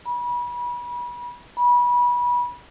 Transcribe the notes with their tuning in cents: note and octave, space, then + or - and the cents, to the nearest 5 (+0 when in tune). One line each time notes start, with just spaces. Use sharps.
B5 -30
B5 -25